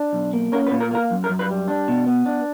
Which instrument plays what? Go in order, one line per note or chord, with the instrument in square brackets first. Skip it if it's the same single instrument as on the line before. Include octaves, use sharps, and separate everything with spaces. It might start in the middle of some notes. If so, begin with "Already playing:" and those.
Already playing: [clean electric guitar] D4
B1
A#3
C#4 A#4
B4
A#2
A#4
A#3 A#4
F#2
A#4
F#2
B4
G3
D4
B2
B3
D4